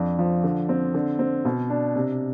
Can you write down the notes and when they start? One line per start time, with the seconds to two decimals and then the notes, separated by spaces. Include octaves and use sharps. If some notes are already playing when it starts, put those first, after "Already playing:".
Already playing: F2 D4
0.19 F3
0.44 D3
0.69 C4
0.94 D3
1.19 C4
1.45 B2
1.70 D4
1.96 C3